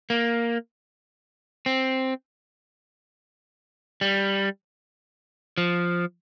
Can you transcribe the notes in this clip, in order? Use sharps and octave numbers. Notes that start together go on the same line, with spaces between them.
A#3
C4
G3
F3